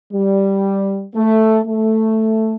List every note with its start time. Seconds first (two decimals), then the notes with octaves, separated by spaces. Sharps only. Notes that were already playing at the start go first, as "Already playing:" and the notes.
0.13 G3
1.15 A3
1.66 A3